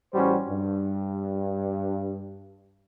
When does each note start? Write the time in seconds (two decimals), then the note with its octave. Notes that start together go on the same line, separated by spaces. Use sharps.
0.14 A1 G3 C#4 F#4 C5
0.49 G2